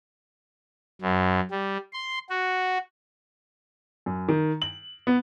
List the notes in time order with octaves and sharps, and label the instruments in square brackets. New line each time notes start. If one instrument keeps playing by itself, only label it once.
[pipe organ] F#2
G3
C6
F#4
[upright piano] F#2
D#3
F#7
B3